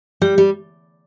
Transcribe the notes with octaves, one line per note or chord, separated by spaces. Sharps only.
G3 G4
G3